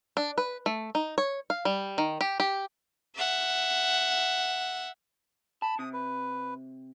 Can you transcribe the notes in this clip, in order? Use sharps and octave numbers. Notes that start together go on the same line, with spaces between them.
D4
B4
A3
D#4
C#5
F5
G3
D#3
G4
G4
E5 F#5
A5 B5
C3 D#6
B4